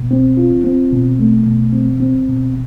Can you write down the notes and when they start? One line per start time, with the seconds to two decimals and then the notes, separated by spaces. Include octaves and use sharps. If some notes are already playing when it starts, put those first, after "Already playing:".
Already playing: B2
0.11 C4
0.37 F4
0.64 C4
0.93 B2
1.19 A3
1.46 B2
1.73 C4
2.00 C4
2.28 B2